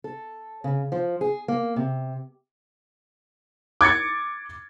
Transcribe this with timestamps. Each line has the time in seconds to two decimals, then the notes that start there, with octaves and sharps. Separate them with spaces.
0.04 A4
0.64 C#3
0.92 F3
1.21 G#4
1.48 A#3
1.76 C3
3.81 D6 G#6 A6 C#7